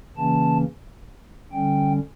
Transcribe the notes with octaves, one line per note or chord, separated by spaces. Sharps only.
C#3 E3 A#3 C#4 A5
D3 G3 C#4 G5